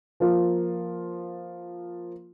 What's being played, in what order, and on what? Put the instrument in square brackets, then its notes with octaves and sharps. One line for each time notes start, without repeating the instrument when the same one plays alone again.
[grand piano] F3 A#3 F4